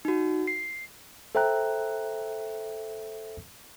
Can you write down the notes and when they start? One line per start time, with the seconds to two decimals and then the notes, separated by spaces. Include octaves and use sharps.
0.05 D#4 F#4
0.47 C7
1.35 A4 C5 E5 G5 A#5 F#6